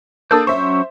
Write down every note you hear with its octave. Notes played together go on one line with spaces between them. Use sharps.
A#3 D4 A4 D#6 E6 G6
F#3 C#4 C5 E5 C#6